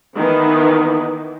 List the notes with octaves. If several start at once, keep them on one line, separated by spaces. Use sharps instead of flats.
D#3 E3 B3